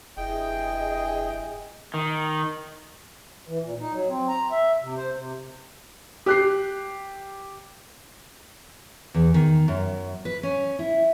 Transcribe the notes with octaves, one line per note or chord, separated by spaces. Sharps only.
F1 G2 E4 G#4 D#5 G5
D#3
E3
A#2
D#4
F#3
C4
A#5
E5
C3
C5
C3
G4 F#6 C7
E2
D#3
F#2
B4
C#4
E4